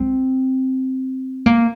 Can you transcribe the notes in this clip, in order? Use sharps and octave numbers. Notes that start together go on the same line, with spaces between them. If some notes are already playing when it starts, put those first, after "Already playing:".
Already playing: C4
A#3